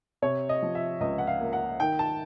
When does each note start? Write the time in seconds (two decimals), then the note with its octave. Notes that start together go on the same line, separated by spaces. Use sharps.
0.22 C3 C#5
0.49 D#5
0.62 F3
0.75 E5
1.00 C#2 D#5
1.18 F#5
1.27 F5
1.40 A#3
1.53 F#5
1.80 D#3 G5
1.99 A5